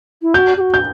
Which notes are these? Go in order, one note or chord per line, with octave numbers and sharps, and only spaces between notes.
E4
F#4 G6
G4
F#4
G6